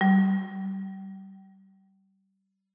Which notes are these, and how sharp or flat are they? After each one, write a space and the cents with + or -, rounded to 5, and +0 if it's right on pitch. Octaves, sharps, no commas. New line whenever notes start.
G3 -25